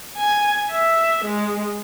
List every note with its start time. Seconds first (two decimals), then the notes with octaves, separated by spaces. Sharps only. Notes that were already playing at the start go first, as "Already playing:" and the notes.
0.17 G#5
0.71 E5
1.24 G#3